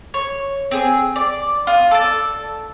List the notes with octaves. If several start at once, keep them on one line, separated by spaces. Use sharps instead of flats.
C#5
C4 G#4
D5
F4 D#6
A4 D5